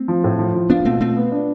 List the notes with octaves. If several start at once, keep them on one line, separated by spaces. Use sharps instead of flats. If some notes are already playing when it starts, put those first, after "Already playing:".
Already playing: A3 C4
F3
A2
F3
F3
B3 D4 F4
B2 A3 C4
A3 C4 F4
B3
D4